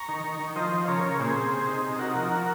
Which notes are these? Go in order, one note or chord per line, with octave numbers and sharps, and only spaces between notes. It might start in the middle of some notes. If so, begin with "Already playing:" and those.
Already playing: A#5 C#6
D#3
D#3
D#3
F3 C5 D#5
F3
C#3 A#4 C#5
C#3
A#2 G#4 C5
C4
C3
D#4
C3
D#4 F#4 A#4
F3
F3